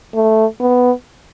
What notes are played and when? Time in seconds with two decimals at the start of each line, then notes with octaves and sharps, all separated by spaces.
0.14 A3
0.60 B3